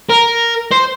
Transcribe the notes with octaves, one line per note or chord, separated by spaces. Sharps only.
A#4
C5